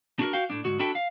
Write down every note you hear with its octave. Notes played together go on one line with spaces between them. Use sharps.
D4 F#4 G#4 A#4
F#4 F5 G5
A2 D4
D2 G#2 F#4
D4 E4 F#4 A4 E5 G5
F5